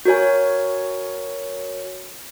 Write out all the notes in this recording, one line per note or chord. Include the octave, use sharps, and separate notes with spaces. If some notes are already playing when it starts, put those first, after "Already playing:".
F#4 A#4 C#5 G#5